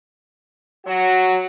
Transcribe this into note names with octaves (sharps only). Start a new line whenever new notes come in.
F#3 F#4